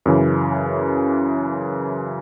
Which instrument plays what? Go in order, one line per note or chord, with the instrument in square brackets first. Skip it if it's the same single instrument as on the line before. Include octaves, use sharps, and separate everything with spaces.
[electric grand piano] F#2 C#3 E3